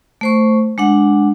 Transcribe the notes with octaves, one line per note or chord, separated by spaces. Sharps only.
A3 C5 C#6
G#3 D4 F#5